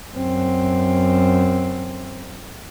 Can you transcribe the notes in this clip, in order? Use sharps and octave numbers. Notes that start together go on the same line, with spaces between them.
F#2 C4